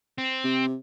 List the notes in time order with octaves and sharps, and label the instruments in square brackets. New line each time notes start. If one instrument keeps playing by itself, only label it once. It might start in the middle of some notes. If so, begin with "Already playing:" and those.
[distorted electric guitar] C4
[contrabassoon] C3